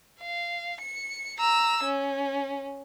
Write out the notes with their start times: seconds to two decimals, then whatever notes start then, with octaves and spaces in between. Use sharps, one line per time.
0.20 F5
0.80 C#7
1.39 A#5 E6
1.84 C#4